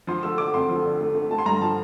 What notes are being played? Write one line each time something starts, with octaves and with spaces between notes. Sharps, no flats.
F3 C6
A3 E6
D3 D6
F2 C6
F3
D3
A3
A3
A3 A5
C6
G2 A#5
F3 A5